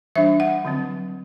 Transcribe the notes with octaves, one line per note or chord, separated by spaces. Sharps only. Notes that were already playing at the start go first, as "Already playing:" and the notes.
E3 G3 D4 E5
F#5
D3 F#3 C4